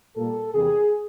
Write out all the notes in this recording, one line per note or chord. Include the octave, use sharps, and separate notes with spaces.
A#2 G3 A#3 A4
E2 C3 E3 G3 A#3 G#4